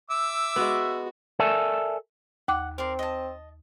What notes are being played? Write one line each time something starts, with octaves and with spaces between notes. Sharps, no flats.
E5 D6 E6
G#3 B3 F#4
A4 A#4 D5 E5 G#5 A5
D#2 F#5 D6
C4 A#4 D5 C6
D#5 A5